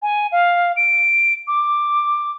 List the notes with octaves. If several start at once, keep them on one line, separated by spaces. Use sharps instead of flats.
G#5
F5
D7
D6